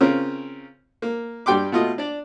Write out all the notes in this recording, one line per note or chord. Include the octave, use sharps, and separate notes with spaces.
C#3 C4 C#4 F4 A#4
A#3
G2 G3 G5 C6 D6
B2 A3 F4 D#5
D4 D5